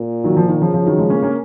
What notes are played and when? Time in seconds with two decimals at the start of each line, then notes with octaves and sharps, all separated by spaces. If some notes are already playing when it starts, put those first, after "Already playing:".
Already playing: A#2
0.24 D#3 F#3
0.37 F3
0.49 D#3
0.61 C#3 F3
0.74 F3
0.86 D#3 F#3
0.98 F3 G#3
1.10 A#3 C#4
1.22 A#3 C#4